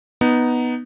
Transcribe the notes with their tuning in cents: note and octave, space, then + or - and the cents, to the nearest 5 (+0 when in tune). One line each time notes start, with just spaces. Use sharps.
B3 +0 D#4 +0